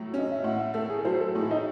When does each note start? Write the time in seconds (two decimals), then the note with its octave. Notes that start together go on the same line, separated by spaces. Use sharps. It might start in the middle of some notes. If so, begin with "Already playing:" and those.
Already playing: A2 F#3 A3
0.14 C#4 D#5
0.32 E5
0.44 A2 F#5
0.59 E5
0.74 A3 A4
0.90 G#4
0.99 A4
1.05 F#3 C5
1.20 A4
1.35 A2 G#4
1.42 E4
1.51 D#4